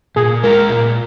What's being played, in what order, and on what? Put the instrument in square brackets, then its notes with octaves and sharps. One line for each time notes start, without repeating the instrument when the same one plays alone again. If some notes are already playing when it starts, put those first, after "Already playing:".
[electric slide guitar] A#2 [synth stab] G#4
[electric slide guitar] G#3 F4 [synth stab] A#4
[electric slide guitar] A#2